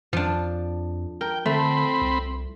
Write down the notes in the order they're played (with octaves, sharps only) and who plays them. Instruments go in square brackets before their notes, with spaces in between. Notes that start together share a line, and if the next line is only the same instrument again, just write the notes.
[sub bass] F2 [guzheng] F3 D4
[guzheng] A#4 [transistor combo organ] G5
[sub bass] D3 [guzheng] A3 [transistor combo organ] C4 B5
[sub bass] C2